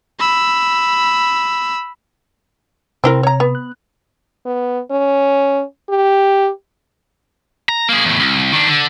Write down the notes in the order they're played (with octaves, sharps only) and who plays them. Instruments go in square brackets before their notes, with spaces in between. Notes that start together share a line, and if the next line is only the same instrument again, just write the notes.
[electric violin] B5 E6
[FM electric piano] C3 [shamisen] C4 E4 A#4
[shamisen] C#5 A#5
B3
[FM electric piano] F#6
[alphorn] B3
C#4
G4
[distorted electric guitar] A#5
A#3 G#4
E2 A2
C2
D#3 D4
D3